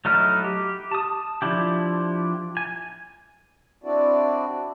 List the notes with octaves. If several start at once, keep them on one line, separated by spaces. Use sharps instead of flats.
F#3 A3 D#4 E4 F6
G4
A5 D#6
F3 D4 E4 G4
G#5
C4 D4 E4 F#4 D5